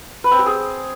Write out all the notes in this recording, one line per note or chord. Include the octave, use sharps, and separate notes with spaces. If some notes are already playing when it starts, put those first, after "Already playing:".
B4
C4
G4
G#4